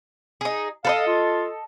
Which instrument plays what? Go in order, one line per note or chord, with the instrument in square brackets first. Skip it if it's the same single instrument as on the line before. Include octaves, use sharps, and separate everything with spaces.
[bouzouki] D#4 G#4
[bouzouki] A4 B4 D#5 [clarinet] F5
[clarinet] F4